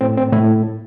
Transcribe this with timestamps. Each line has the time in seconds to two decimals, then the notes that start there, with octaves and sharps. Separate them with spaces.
0.01 A2 C4
0.18 C4
0.33 A2 E4